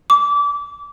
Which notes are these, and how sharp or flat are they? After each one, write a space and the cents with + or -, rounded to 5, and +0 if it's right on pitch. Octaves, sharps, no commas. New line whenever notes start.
D6 -25